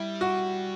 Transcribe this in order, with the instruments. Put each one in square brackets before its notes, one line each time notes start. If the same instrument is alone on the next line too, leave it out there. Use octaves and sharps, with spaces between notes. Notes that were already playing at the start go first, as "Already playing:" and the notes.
Already playing: [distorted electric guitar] G3 [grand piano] E4
[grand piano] F#4